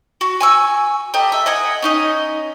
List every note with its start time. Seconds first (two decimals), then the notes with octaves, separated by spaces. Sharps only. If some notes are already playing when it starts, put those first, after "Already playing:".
0.21 F#4
0.40 G#5 C#6 E6
1.14 G4 A4 D#5 A#5
1.32 E5
1.46 D#5 F#5 G#5 D#6
1.82 C#4 D#4 D#5